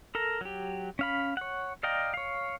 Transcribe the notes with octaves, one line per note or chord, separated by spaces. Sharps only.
A4 A#4 A#5
F#3 G4
C#4 F5 B5
C#5 F#5
D5 D#5 F5 G5 A#5
C#5 F5